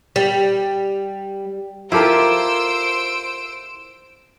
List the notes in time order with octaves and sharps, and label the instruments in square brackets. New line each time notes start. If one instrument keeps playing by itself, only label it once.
[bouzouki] G3
[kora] E4 G4 A4 [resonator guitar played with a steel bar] F4 A#4 [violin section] C5 E6 D7